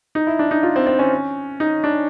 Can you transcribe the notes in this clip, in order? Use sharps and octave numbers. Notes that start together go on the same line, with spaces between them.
D#4
E4
D4
D#4
F4
C4
C4
C#4
D#4
D4